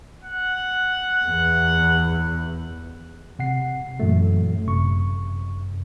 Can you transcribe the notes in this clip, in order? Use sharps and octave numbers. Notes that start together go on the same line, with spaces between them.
F#5
E2
C3 F#5 C7
F#2 A#2 E3 F#3 A3
G1 F#2 C3 C#6